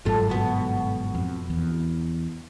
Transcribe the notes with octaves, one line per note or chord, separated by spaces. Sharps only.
G1 G#2 F#3 A3 F4
B2 B3
F2
E2